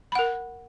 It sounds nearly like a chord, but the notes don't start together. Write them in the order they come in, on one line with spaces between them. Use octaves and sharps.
B5 F#5 A#4